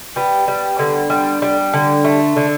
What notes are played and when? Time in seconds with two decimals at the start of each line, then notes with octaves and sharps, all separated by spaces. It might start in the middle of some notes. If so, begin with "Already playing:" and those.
0.16 G3 B3
0.48 G3
0.79 D3
1.10 G3
1.42 G3
1.73 D3
2.04 A3
2.37 D3